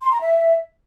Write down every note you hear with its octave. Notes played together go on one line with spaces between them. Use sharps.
C6
A#5
E5